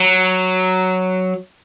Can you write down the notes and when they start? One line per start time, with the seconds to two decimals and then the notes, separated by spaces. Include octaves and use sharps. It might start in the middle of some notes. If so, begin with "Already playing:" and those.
Already playing: F#3